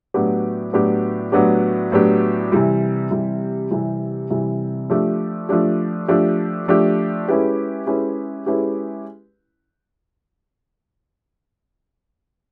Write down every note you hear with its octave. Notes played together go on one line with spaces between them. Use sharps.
A2 F#3 B3 D4 G4
A2 F#3 B3 D4 G4
A2 F#3 B3 D4 G4
A2 F#3 B3 D4 G4
C3 E3 G3
C3 E3 G3
C3 E3 G3
C3 E3 G3
F3 A3 D4 G4
F3 A3 D4 G4
F3 A3 D4 G4
F3 A3 D4 G4
G#3 C#4 E4 G4 B4
G#3 C#4 E4 G4 B4
G#3 C#4 E4 G4 B4